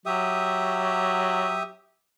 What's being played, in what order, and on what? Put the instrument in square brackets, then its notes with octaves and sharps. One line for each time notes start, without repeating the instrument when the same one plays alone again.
[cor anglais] F#3 [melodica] G4 E5 D#6